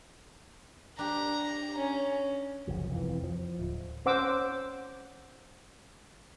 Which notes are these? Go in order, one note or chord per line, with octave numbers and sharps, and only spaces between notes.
D4 G4 A#5
C#4
F#1 C2 F3
F2 C3 E3
F3
D1
C#4 C5 F#5 D6 E6